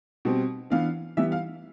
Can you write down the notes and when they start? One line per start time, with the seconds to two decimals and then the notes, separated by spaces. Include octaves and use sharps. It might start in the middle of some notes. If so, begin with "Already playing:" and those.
0.25 B2 G3 C4
0.70 E3 B3 D4 F5
1.17 E3 G3 B3 E5
1.32 F5